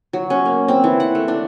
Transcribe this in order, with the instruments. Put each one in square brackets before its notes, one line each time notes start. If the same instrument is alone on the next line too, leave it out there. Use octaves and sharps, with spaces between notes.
[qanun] F#3
C#4
A#3
C4
E3
F#5
A3
D4